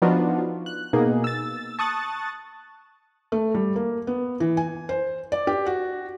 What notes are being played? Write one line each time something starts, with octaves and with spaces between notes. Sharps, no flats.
F3 B3 D4 D#4 F4 F#4
F#6
B2 A#3 D#4 G#4
E6 A6
A5 C#6 D#6 F#6 A6
A3
G3
A#3
B3
E3
G#5
C5
D5
G4
F#4